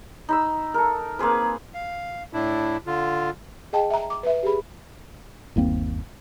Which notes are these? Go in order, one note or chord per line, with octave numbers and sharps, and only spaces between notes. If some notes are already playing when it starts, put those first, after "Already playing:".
D#4 B5 E6
A4 A#4
A#3 C4 G#4 B4
F5
A2 D4 E4
D3 F4
G#4 D#5 G5 A5
E5 A#5
D6
B4 E5
G4 G#4 B5
G1 D#2 A#3 C4